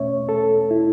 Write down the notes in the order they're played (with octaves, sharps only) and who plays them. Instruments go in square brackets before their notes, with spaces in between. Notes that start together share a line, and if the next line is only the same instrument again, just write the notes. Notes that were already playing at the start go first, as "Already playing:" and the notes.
Already playing: [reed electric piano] E2 B2 A3 C#4 C#5 E5
A4
E4